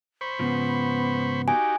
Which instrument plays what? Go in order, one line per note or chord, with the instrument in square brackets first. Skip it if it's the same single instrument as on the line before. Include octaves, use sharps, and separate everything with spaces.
[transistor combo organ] C5 B5 C#6
[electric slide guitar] G#2 C#3 F3 [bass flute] B3
[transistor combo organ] D#4 F#4 G4 [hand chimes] G#5